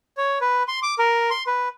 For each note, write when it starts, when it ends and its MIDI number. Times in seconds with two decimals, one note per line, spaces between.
0.17 0.39 73
0.41 0.63 71
0.68 0.80 84
0.83 0.95 86
0.99 1.30 70
1.30 1.43 84
1.47 1.69 71